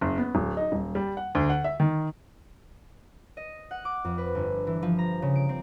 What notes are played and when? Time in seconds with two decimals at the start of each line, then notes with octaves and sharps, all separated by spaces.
0.01 F#1
0.18 B3
0.35 D1
0.57 D#4
0.72 D#1
0.95 G3
1.17 F#5
1.35 D2
1.50 F#5
1.64 E5
1.80 D#3
3.37 D#5
3.71 F#5
3.85 D6
4.05 F2
4.18 B4
4.35 G1
4.67 E3
4.82 F3
4.99 A#5
5.22 C#3
5.35 D7
5.49 C4